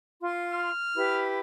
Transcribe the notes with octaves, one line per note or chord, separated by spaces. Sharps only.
F4 C6
F6
E4 G4 B4